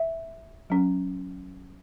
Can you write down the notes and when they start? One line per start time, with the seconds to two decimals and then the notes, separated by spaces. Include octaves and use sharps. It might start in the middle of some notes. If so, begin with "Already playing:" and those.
Already playing: E5
0.70 F#3 C#4